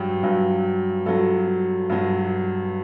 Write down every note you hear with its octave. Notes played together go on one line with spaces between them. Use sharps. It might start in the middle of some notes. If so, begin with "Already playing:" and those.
Already playing: G2 F#3 G4
G2 F#3
G2 F#3 A4
G2 F#3